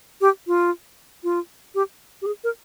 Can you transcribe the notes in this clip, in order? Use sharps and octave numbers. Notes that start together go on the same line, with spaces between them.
G4
F4
F4
G4
G4
G#4
A#4